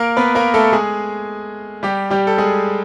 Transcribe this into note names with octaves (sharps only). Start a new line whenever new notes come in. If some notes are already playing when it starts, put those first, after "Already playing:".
Already playing: A#3 A#4
B3 B4
A#3 A#4
A3 A4
G#3 G#4
G3 G4
G3 G4
A4
G#3 G#4